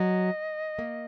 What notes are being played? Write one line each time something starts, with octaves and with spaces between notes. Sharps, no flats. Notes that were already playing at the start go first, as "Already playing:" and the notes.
Already playing: F#3 D#5
A#3